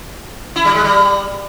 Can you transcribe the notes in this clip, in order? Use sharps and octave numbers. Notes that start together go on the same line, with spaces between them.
E4
G3
G#3
G3